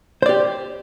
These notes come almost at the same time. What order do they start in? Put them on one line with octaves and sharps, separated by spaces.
C5 D5 G4